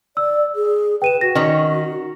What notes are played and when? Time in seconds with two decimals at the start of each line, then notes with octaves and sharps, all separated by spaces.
0.17 D5 E6
0.55 G#4
1.02 B4 G5 D#7 E7
1.21 F#4 A#6
1.35 D#3 C#4 C#5